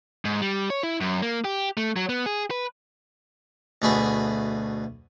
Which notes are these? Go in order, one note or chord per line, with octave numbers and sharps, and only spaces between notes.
G#2
G3
C#5
E4
F#2
A#3
G4
A3
F#3
B3
G#4
B4
D2 B2 A3 G#4 G#5 B5